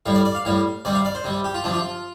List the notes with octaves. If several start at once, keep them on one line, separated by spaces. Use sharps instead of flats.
A2 G3 F5
D5
D5
F5
A2 G3 F5
C3 G3 D5
F5
D5
C5
C3 G3
G4
F4
C3 F3 D4
F4